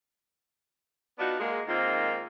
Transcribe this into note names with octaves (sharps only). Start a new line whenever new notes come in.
B3 D4 D#4 F4 F#4
G#3 A#3
G#2 D#3 A#3 C4 F4